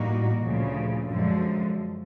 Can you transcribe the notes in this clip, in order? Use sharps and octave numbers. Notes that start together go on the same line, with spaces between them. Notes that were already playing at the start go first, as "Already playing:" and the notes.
Already playing: A2 E3 G3 A#3 D#4 F#4
D2 A#2 C#3 F3
F#2 D3 F3 G#3